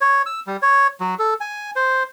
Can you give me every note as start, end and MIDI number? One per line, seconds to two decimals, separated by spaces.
0.01 0.22 73
0.26 0.40 88
0.47 0.57 55
0.62 0.87 73
1.01 1.15 54
1.19 1.34 69
1.41 1.71 80
1.76 2.03 72